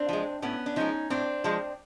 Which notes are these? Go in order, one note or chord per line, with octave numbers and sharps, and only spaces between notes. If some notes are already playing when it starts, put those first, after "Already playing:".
Already playing: C4 D4
F3 G#3
A2 B3 C#4
D4
F3 G#3 C#4 D#4
A2 C4 D4
F3 G#3